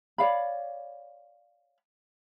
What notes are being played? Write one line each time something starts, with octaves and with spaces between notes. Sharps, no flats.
C#5 D5 F5 B5